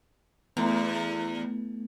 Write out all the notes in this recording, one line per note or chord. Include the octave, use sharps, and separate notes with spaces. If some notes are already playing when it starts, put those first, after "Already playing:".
E2 A3 B3